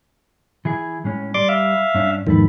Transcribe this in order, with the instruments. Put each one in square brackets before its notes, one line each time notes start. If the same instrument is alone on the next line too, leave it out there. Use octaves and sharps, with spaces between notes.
[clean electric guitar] E3 E4 G#4
A2 G#3 C#4
[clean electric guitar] G3 [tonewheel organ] D5 C6 D6
[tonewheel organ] E5 F5
[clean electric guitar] G2 C#4 D4
[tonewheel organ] E2 G#2 D#3 [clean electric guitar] F3 A4 B4